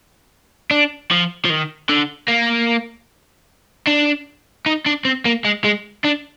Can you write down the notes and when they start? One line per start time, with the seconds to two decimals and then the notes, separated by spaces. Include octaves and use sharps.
0.71 D4
1.11 F3
1.45 F3
1.50 D#3
1.89 D3
2.28 A#3
3.87 D4
4.66 D#4
4.86 D4
5.05 C4
5.25 A#3
5.45 G#3
5.64 G#3
6.04 D4